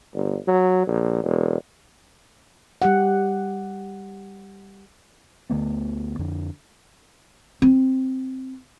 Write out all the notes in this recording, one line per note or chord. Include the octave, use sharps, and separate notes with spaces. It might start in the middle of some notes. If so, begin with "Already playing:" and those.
G1
F#3
A#1
E1
G3 G4 F#5
D2 D3 A3 B3
F2 D3
C4